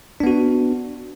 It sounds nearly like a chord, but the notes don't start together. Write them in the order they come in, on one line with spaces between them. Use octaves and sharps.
D4 B3 F#4